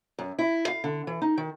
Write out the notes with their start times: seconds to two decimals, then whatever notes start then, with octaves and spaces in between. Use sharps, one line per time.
0.19 F#2
0.39 E4
0.68 F5
0.84 D3
1.07 E3
1.22 D#4
1.37 D#3